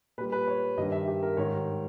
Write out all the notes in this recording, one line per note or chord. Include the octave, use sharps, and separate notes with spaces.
A#2 G3 B4
B4
C#5
G2 D#3 G3 D#5
E5
G4
A#4
G#2 D#3 G3 C#5